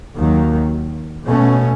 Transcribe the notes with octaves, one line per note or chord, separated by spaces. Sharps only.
D#2 D#3 F#3
B2 A3 C#4